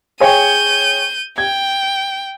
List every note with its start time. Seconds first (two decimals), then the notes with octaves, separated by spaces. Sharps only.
0.20 G#4 C#5 G5 G6 D#7
1.38 G5 G#6